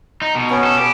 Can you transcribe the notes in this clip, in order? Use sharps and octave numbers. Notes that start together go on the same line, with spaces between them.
D#4
B2
B3 C#4
A4
G4